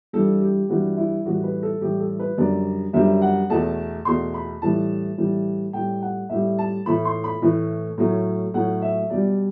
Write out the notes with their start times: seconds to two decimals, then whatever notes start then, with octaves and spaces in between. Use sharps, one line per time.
0.13 G2 E3 G3 A4
0.41 G4
0.69 G2 E3 G3 F#4
0.97 E4
1.25 A2 E3 G3 F#4
1.44 B4
1.63 A4
1.81 A2 E3 G3 G4
2.00 A4
2.19 B4
2.37 F#2 D3 G3 D5
2.93 F#2 D3 G3 E5
3.22 F#5
3.50 E2 B2 A3 A5
4.05 E2 B2 A3 C6
4.34 B5
4.62 A2 E3 G3 A5
5.18 A2 E3 G3
5.73 A2 G3 G5
6.02 F#5
6.29 A2 G3 E5
6.59 A5
6.86 A2 E3 A3 B5
7.05 C6
7.24 B5
7.42 A2 E3 A3
7.98 A2 F#3 A3
8.54 A2 F#3 A3 F#5
8.82 E5
9.10 B2 G3 D5